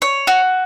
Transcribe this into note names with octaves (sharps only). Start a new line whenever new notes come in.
C#5
F#4